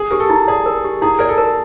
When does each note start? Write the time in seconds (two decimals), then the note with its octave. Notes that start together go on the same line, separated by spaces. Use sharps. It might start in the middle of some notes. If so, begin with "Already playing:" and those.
Already playing: G#4
0.10 G4 A#4
0.20 A4
0.30 E4
0.48 G#4 D5
0.66 A#4
0.84 G4
1.02 E4 G#4
1.19 A#4 D5
1.29 A4
1.38 A#4